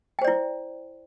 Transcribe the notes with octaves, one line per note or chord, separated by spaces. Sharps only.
E4 C5 D5 G5